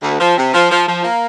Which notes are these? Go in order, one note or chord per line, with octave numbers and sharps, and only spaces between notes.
D2
F3
C3
F3
F3
F3
A#3